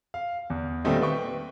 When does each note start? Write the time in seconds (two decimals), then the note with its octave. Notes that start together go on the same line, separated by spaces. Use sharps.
0.14 F5
0.50 E2
0.85 A#2 D#3 G3 A3 C4 D#4
1.02 B4 G5 C#6